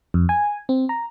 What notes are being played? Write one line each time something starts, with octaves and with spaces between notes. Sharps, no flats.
F2
G#5
C4
A#5